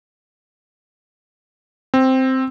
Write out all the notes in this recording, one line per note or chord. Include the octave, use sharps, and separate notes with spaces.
C4